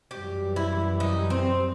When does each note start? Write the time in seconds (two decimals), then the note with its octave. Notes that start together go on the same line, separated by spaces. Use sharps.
0.11 F#2 E3 G3 G4
0.56 E4
1.00 D#4
1.30 C4